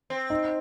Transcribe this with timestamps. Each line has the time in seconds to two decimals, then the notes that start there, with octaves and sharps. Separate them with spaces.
0.10 C4
0.30 D#4